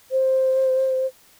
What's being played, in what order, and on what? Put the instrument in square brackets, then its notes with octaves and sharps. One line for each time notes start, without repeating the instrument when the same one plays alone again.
[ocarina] C5